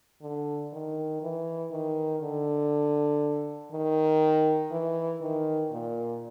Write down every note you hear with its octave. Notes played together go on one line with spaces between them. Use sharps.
D3
D#3
E3
D#3
D3
D#3
E3
D#3
A#2